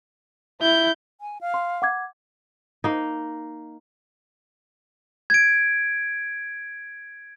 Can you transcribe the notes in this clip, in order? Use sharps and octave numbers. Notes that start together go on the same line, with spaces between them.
E4 G6
G#5
F5
C6
F#5 D6 G#6
A#3 D#4
G#6 D7